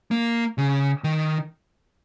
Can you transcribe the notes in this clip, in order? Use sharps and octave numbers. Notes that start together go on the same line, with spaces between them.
A#3
C#3
D#3